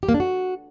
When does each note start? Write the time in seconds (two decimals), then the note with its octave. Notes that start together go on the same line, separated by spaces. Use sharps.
0.03 G4
0.09 A#3
0.14 D4
0.20 F#4